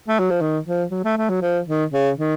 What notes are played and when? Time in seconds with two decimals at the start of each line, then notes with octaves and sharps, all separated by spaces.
0.08 A3
0.19 F#3
0.30 F3
0.41 D#3
0.66 F3
0.91 F#3
1.04 A3
1.17 A3
1.29 F#3
1.42 F3
1.67 D#3
1.93 C#3
2.17 D#3